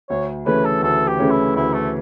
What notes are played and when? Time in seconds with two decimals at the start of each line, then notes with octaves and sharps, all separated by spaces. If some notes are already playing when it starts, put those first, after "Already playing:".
0.09 D2 C#5
0.46 C#3 E3 A3 C#4 B4
0.65 A4
0.82 D2 A4
1.07 G4
1.19 C#3 E3 A3 C#4
1.31 E4
1.56 D2 E4
1.74 A3